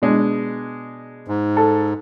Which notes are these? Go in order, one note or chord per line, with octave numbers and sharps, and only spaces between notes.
B2 G#3 D4
G#2
A4